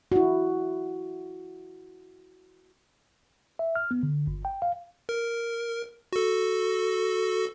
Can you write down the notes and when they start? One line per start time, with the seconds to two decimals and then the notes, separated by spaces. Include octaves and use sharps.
0.12 E4 F#4
3.59 E5
3.75 F6
3.91 B3
4.03 D3
4.27 G1
4.45 G5
4.62 F5
5.09 A#4
6.13 F#4 A4